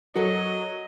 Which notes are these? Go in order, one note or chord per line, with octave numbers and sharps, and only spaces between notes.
F#3 F#4 A4 A#4 D#5